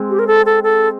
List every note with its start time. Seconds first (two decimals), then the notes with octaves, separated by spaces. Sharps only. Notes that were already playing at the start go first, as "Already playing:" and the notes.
Already playing: G#3 C4
0.10 G4
0.19 A#4
0.27 A4
0.46 A4
0.63 A4